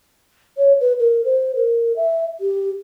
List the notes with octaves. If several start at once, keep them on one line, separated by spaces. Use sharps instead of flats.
C#5
B4
A#4
C5
A#4
E5
G4